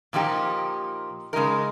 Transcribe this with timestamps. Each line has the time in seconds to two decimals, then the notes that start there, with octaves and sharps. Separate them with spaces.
0.13 A#2 F3 A#3 D#4 G4
1.33 C#3 G#3 D#4 A#4